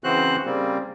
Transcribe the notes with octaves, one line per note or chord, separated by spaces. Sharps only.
C#3 E3 C4 F#4 C5 F#6
C#3 G3 A#3 C4